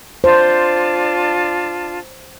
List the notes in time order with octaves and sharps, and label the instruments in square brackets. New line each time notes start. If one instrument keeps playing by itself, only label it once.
[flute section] D4 F4 A5 [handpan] C5